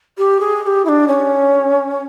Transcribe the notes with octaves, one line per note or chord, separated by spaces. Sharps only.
G4
G#4
G#4
G4
E4
D4
C#4